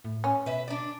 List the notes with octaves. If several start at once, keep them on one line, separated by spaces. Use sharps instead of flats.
A2
C#4
B2 B4 E5
D4 D5